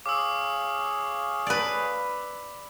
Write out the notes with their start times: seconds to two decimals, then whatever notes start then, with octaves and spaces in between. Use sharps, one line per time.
0.06 G#4 C#5 F5 D6 E6
1.47 B4 D5